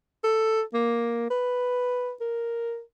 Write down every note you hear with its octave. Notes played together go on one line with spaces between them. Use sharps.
A4
A#3
B4
A#4